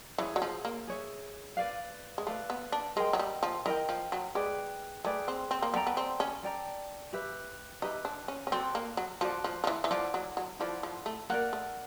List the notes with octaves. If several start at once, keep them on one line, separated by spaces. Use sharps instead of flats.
E3 G#4 C#5 E5
F#3
F3
A#3
G#4 C#5 E5
B4 D5 F5
G#3
A3 B4 D5 F5
B3
D4
G#3 A#4 D#5 G5
F#3
G3
F3
E3 A#4 D#5 G5
F3
F#3
G#3 G#4 B4 D5 G5
A3 G#4 B4 D5 G5
C4
C4
A#3
B3 A4 D5 G5 A#5
B3
C4
C#4
A4 D5 G5 A#5
G4 B4 E5
D#4 G4 B4 E5
D4
C#4
C#4
C4 F#4 A4 D5
A#3
F#3
F3 F#4 A4 D5
F3
F3
E3
E3
F3 E4 A4 D5 F#5
F#3
F#3
F3 E4 A4 D5 F#5
F3
A3
A#3 A#4 D5 F#5
A3